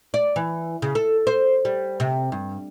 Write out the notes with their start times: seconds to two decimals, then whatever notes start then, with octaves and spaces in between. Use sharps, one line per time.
0.14 D5
0.36 E3
0.82 C#3
0.95 A4
1.27 C5
1.65 G3
2.00 C3
2.32 G2